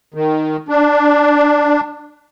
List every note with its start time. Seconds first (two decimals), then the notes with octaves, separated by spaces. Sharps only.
0.14 D#3
0.69 D4